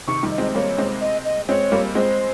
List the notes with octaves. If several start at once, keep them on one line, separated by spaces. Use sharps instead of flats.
C3 D#3 C#6
D#3 G3
D#5
G#3 C4
G3 A#3 C#5
G#3 C4
D#5
D#5
G#3 C4 C#5
G3 A#3
G#3 C4 C5